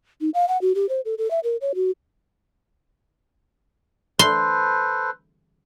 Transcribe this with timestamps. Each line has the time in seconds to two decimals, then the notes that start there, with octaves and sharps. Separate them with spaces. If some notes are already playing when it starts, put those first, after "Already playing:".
0.21 D#4
0.34 F5
0.48 F#5
0.61 F#4
0.75 G4
0.89 C5
1.05 A4
1.18 A4
1.31 E5
1.44 A#4
1.61 C#5
1.75 F#4
4.19 A4 B4 C5 C6